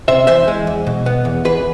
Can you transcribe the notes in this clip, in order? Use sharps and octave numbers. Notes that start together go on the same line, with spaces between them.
C3 C5 E5
E3 C5 E5
G#3
E2
B2
B3
E2
E2 G#4 B4